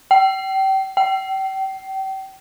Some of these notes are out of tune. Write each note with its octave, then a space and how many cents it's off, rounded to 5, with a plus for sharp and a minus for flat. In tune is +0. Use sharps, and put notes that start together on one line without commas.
G5 -30
G5 -35